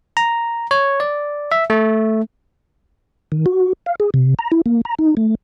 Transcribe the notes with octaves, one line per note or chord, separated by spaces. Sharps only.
A#5
C#5
D5
E5
A3
D#3
F#4
F5
G#4
C3
A#5
E4
A#3
A#5
D#4
A3